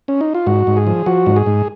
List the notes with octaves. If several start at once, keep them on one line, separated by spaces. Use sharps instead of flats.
C#4
D#4
F4
G#2 F#4
G#2
G#4
F3
F3 F#4
G#2
G#4
G#2